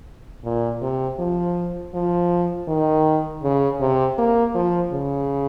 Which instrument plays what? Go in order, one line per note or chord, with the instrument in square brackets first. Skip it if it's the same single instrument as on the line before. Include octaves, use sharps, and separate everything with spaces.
[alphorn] A#2
C3
F3
F3
D#3
C#3
C3
A#3
F3
C#3